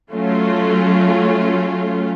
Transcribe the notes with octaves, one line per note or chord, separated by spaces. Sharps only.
F#3 A3 C#4 F4